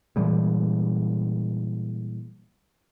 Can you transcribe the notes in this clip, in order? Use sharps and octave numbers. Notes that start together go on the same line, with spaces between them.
A#2 E3 G3 G#3